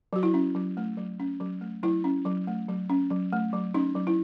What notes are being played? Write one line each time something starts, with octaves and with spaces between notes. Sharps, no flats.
F#3 F#4
E4
C#4
F#3
A3
F#3
C#4
F#3
A3
F#3 E4
C#4
F#3
A3
F#3
C#4
F#3
A3
F#3
C#4 D#4
F#3
E4